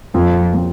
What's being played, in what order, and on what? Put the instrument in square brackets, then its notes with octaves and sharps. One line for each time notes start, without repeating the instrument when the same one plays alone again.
[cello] F2 [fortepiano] A#2 F3 C4
[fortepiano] A#2 F3 C4